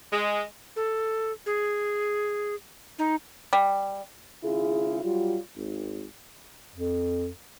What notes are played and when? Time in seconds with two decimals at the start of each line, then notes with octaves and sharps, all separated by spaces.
0.12 G#3
0.76 A4
1.46 G#4
2.99 D#4
3.53 G3
4.44 G#1 C#3 E4 F4 G#4
5.03 F#3 G3 F4
5.56 G#1
6.75 F2